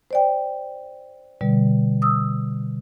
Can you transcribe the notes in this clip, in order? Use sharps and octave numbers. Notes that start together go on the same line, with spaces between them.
C5 D5 G5
B2 D3 G3
D#6 E6